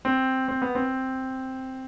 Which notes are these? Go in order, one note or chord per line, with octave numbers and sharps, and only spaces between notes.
C4
C4
B3
C4